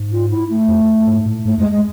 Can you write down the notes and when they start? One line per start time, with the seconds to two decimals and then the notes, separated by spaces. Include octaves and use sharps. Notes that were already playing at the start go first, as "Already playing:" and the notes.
Already playing: G#2
0.12 F4
0.31 E4
0.49 A3
0.68 F2
1.07 G#2
1.26 A2
1.45 G#2 A3
1.58 F2 G#3
1.70 G#3